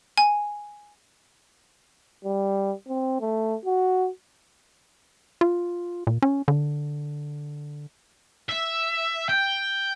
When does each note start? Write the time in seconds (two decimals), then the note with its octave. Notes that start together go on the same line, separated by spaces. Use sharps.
0.18 G#5
2.25 G3
2.88 C4
3.20 A3
3.65 F#4
5.41 F4
6.07 A#2
6.22 C#4
6.48 D3
8.49 E5
9.29 G5